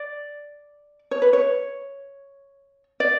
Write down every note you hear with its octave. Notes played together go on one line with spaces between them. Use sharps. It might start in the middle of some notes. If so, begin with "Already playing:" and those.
Already playing: D5
C#5
B4
C#5
D5